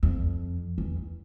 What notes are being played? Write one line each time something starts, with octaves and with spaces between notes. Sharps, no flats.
F2
E2